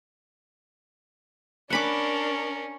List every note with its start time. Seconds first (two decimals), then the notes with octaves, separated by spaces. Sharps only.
1.70 C#4 D4 A#4 F#5 B5 D6